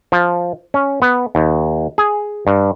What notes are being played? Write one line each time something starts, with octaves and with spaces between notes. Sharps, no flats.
F3
C#4
B3
D#2
G#4
G2